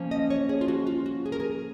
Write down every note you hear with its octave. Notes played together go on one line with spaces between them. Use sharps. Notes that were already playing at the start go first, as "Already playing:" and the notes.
Already playing: F3 A#3 C#4
D#5
C#5
G#4
F4
F#4
F4
F#4
G#4
A#4
G#4